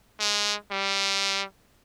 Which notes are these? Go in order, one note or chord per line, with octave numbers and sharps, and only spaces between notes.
G#3
G3